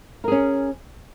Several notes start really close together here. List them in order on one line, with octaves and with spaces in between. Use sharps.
A#4 G#4 C#4